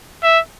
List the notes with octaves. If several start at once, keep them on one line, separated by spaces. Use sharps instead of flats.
E5